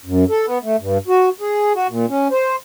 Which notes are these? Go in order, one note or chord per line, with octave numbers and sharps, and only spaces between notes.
F#2
A4
B3
A3
G2
F#4
G#4
F#4
A#2
C#4
C5